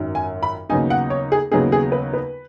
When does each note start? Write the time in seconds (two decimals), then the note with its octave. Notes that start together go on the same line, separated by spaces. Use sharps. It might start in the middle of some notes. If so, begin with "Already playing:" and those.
Already playing: G#1 F#2 D#3 F#3
0.15 G#5
0.43 B5
0.69 D#2 C#3 F#3 B3 D#4 G#5
0.90 F#5
1.10 C#5
1.32 G#4
1.52 D#2 C#3 F#3 B3 D#4 G#4
1.72 G#4
1.92 B4
2.13 B4